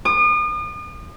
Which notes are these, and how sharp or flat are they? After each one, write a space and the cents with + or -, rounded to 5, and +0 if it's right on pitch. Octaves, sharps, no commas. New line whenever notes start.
D#6 -40